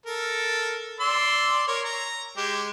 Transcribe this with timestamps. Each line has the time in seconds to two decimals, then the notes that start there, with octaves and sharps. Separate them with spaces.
0.06 A4 A#4
1.00 D5 C6 E6
1.68 A#4 C#5
1.85 A#5
2.37 G#3 G4